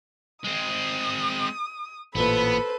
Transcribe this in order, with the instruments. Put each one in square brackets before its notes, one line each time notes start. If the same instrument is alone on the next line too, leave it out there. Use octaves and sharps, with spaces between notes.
[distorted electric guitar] G#3 C4 [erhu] D#6
[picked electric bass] A1 A#2 [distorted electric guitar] B3 [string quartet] A4 B4 C5 [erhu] B5